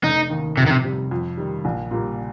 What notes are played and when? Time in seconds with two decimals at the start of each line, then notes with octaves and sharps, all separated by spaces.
0.03 F1 D#4
0.30 D#2 D#3
0.57 F2 C3
0.66 D#3
0.71 C3
0.84 C3 G3
1.11 F2
1.38 D#3 G3
1.65 A#1
1.91 A#2 G3 A#3